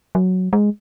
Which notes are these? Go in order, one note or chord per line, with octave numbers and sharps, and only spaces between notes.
F#3
G#3